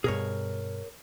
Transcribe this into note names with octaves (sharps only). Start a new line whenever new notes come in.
G2 B2 G#4 A#4 C#5